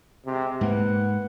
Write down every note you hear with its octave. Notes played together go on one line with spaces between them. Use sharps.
C3 G#3
G#2 A#3 B4 F#5